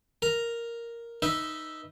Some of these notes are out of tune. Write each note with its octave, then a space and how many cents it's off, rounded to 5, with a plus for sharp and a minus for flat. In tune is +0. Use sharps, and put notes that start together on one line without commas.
A#4 +0 A#5 +0
D#4 +0 B4 -15 E5 +0